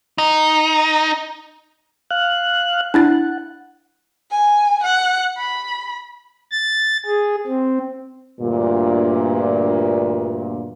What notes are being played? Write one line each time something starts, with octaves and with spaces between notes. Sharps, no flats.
D#4
F5 F#6
D4 E4 F#5 A6
G#5
F#5
B5
A6
G#4
C4
D2 G2 A#2